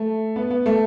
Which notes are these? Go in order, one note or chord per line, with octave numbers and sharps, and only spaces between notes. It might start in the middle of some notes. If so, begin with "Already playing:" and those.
Already playing: A3
B3
B3
A3